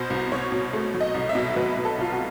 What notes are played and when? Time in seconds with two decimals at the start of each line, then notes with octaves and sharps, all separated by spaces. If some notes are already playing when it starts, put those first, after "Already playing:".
Already playing: B2 C5
0.10 C2
0.32 C2 C#5
0.52 B2
0.73 A3
0.94 F#3
1.01 D#5
1.14 C2
1.29 E5
1.35 B2
1.56 F#3 B4
1.77 B2
1.85 A4
1.98 C2 F4
2.13 F#4